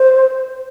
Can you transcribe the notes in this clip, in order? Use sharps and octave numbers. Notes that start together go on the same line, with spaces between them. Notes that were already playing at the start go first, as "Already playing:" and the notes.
Already playing: C5